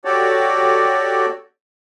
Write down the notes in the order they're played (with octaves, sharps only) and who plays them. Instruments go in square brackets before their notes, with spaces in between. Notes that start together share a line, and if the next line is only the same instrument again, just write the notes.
[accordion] F#4 G4 A4 C#5 D5